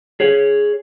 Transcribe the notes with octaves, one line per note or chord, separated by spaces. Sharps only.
G#4 C#5